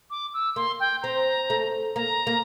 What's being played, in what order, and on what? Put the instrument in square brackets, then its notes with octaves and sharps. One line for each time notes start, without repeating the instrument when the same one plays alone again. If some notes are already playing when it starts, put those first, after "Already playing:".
[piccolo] D6
E6
[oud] A#3 [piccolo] C6
[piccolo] G5
[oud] C4 [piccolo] A#5
[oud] A3
[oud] A#3 [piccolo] A#5
[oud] A#3